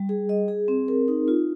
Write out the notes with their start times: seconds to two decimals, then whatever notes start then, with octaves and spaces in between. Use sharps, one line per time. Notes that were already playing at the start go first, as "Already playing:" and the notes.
Already playing: G3
0.09 G#4
0.29 D#5
0.48 G#4
0.68 C4
0.88 A#4
1.08 D#4
1.28 F4